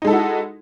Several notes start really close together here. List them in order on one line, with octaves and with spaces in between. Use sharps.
D#4 G#3 A4 E4 F#4